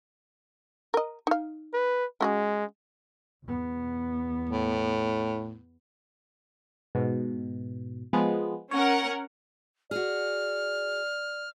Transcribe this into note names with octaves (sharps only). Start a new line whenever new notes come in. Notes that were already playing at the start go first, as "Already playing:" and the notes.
A#4 D#5
D#4 F5
B4
G#3 C#4 F#4 G#4
E2 B3
A2
G#2 B2
F3 G#3 B3
C#4 A#4 C#5 F#5
F#4 G#4 D5 F6